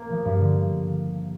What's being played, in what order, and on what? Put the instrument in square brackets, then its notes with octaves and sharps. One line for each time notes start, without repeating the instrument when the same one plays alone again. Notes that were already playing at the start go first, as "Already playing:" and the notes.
Already playing: [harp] A#3
F3
G2
D3